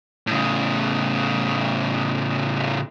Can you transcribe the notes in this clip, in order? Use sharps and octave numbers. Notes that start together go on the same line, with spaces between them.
A2 C#3